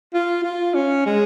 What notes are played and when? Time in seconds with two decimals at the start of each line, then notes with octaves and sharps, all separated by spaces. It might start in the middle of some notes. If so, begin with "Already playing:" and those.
0.14 F4
0.44 F4
0.74 C#4
1.06 G#3